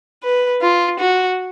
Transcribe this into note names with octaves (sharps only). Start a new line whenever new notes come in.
B4
F4
F#4